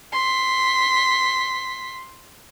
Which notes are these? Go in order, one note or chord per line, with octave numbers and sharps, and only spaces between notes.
C6 B6